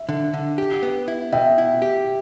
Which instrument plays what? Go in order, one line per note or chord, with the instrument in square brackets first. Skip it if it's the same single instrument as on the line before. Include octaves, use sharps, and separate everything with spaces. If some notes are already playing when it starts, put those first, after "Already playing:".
Already playing: [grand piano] E5
[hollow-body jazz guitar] D3
D3
G4
B3
E4
[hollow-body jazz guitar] B2 [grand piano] E5 G5
[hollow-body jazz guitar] E4
G4